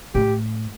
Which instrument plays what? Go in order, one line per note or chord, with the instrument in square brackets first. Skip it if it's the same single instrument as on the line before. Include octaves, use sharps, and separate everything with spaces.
[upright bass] A2 [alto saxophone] G4